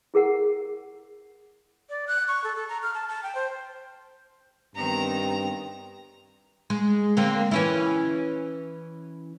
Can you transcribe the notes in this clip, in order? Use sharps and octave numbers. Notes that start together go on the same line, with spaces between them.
E4 G#4 A#4 F#5
D5
F#6
C#6
A4
A4
A#5
F6
A5
A5
G5
C5
G2 D#3 B3 C4 A#5
G#3
D3 A#3 C4
E3 C#4 E4